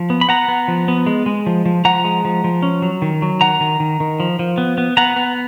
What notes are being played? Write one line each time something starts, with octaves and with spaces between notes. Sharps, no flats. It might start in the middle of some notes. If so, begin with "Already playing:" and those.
Already playing: F3
B3
B5
B3 F#5 A#5
B3
F3
B3
G#3
G#3
F3
F3
F3 F#5 A#5
G#3
F3
F3
C#4
F#3
D#3
F#3
D#3 F#5 A#5
D#3
D#3
D#3
F3
F3
B3
B3
B3 F#5 A#5
B3